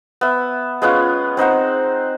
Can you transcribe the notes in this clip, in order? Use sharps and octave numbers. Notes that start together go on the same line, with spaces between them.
B3 E5
G#3 B3 C#4 F4
C4 D#4 C5 F#5